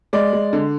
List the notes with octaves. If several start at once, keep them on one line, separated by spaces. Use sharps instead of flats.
G#3 D5
G#3
D3